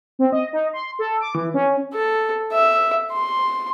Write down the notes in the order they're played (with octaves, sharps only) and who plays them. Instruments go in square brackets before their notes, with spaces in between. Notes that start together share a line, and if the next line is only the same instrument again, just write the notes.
[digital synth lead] C4
D#5
D#4
C6
A4
D6
E3
C#4
[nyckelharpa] A4
E5
C6